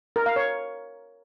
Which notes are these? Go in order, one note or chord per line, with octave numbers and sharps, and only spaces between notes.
A#4
F5
C#5